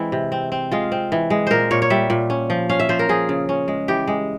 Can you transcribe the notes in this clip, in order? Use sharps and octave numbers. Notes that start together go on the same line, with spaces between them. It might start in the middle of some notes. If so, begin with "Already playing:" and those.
Already playing: E3 G#3 C4 E4
C3
C4
C4
G#3 F4
C4
E3
G#3
A#2 A#4 C5
A#2 C#5
C#5
G3 E5
A#2
C#4
F3
C#4 F5
E5
F3 C5
A#4
F3 G#4
C#3
C#4
G#3
E3 G4
G#3